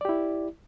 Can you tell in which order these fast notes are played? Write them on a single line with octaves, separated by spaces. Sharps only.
D5 G4 E4